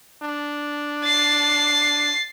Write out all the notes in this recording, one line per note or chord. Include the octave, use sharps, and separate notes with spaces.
D4
A6 C7